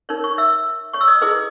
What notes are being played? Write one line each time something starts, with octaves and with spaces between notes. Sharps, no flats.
D#4 A#4 C#5
C#5 C#6
E5 E6
C#5 C#6
E6
D#5 D#6
E4 G#4 B4 D#5 D#6